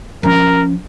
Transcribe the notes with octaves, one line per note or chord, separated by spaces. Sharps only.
F3 C#4 A#4